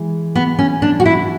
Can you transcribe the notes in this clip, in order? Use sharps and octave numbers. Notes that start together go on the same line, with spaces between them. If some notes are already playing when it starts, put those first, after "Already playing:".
Already playing: E3 G#3
B3
C#4
D4
F#4
E4